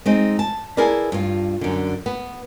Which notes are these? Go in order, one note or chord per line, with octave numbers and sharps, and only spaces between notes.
G#3 C4 D#4
A5
E4 G#4 A#4 B4 D5
G2 F4
F#2 D3
B3